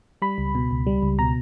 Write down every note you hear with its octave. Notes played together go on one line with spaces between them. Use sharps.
G3 B5
C#2
B2
C#2
G3
C#2
B2 A#5